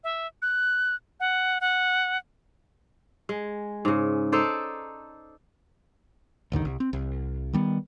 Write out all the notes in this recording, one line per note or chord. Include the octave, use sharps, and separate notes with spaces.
E5
F#6
F#5
F#5
G#3
G#2 C#3
D#4 A4 C5 D5
A1 D#2 D3 D#3
C2
C4
C2
D#3 G3 B3